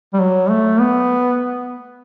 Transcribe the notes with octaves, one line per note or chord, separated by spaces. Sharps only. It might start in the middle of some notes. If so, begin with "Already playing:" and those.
G3
F#3
A3
B3